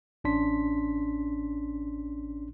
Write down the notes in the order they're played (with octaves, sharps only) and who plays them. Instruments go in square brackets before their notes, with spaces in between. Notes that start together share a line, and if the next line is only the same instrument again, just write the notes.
[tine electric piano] A1 C#4 D4 C6 B6